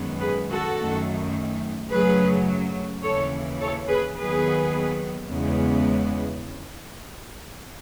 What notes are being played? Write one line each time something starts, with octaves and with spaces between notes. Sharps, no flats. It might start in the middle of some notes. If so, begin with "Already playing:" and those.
Already playing: F#2 D#3 G#3 B3
G#4 B4
F#4 A4
F#2 D#3 A3
F#2 C#3 F#3 A3 G#4 B4
D#2 C#3 E3 A4 C#5
A4 C#5
G#4 B4
D#2 D#3 F#3 B3 G#4 B4
E2 C#3 G#3 B3